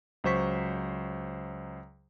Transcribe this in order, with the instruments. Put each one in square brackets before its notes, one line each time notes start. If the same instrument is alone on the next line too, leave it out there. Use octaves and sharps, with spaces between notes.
[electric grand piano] C#2 F#3 C5 C#6 B6